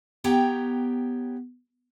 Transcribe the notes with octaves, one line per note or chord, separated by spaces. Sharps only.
B3 G4 C#5 G5 A#5